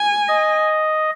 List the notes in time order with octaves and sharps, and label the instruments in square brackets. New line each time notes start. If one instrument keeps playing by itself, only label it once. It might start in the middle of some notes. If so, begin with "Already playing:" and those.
Already playing: [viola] G#5
[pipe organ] D#5